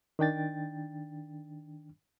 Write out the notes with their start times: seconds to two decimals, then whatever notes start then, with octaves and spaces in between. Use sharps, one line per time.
0.19 D#3 D4 G5 A6